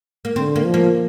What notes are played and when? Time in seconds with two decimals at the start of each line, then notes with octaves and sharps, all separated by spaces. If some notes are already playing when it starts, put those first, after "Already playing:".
0.25 A#3
0.36 D3 C4
0.56 A#3
0.65 F3
0.74 A#3